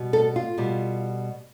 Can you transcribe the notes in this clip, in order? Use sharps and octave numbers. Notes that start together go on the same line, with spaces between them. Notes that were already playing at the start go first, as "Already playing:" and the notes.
Already playing: B2 G3
A4
F4
B2 G3